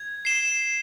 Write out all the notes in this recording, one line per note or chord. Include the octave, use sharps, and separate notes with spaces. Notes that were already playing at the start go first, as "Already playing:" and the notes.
Already playing: G#6
C7 E7 G7